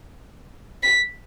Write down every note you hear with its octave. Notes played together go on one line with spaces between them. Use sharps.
B6